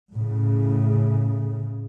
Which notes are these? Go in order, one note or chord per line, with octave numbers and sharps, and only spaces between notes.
A2 C#3